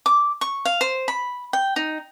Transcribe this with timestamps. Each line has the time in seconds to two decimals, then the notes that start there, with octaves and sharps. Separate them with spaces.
0.06 D6
0.41 C#6
0.65 F5
0.81 C5
1.08 B5
1.53 G5
1.76 D#4